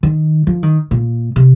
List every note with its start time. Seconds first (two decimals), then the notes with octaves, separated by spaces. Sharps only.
0.03 D#3
0.47 F3
0.63 D#3
0.91 A#2
1.36 C3